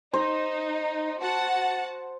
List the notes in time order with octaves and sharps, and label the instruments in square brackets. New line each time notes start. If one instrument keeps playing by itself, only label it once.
[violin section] D#4 [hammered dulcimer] C5
[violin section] F#4 F#5 A5